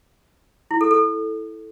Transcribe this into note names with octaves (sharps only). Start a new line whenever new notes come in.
E4
A4
A4